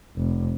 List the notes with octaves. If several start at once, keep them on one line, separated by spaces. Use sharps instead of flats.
F1